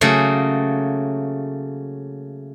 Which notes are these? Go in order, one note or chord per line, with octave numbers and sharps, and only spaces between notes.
C#3 F#3 A3 A#3